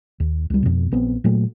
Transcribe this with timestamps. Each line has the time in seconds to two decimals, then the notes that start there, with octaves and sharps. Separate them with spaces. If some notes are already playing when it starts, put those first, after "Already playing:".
0.20 D#2
0.50 C#2 G3
0.63 F2 B2
0.92 A#1 B3 C4
1.24 A#2 F#3 A3